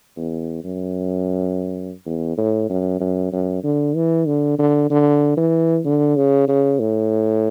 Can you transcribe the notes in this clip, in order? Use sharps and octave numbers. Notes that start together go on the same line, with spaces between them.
E2
F#2
E2
A2
F#2
F#2
F#2
D3
E3
D3
D3
D3
E3
D3
C#3
C#3
A2